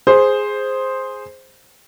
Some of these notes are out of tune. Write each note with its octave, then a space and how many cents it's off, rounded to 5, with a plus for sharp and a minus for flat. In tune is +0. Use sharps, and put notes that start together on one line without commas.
G#4 +0 C5 +0